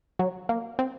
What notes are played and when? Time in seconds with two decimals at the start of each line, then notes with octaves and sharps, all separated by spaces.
0.19 F#3
0.49 A#3
0.79 C4